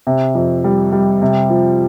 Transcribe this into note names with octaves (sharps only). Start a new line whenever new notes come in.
C3
F2
G3
G3
C3
F3